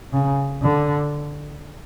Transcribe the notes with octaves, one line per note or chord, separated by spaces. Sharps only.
C#3
D3